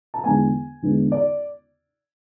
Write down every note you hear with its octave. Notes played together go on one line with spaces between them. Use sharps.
A5
E2 D3 G#3 B3 G#5
E2 D3 G#3 B3
D5